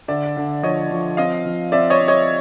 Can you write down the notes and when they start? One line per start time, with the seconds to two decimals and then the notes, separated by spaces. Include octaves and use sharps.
0.08 D3 D5 E5
0.37 D3
0.63 F3 C#5 D#5
0.91 F3
1.17 C4 D#5 F5
1.45 F3
1.72 C4 D5 E5
1.90 C#5 D#5
2.00 C4
2.08 C#5 D#5